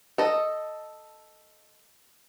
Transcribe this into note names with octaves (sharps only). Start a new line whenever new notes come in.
A4 D#5